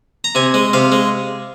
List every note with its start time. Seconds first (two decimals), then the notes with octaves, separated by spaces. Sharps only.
0.24 A#5
0.35 C3 G#5
0.54 G#3
0.73 C3 F5
0.92 G#3